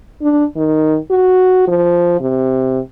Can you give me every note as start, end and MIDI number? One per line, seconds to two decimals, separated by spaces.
0.22 0.45 62
0.56 0.98 51
1.10 1.66 66
1.67 2.16 53
2.21 2.79 48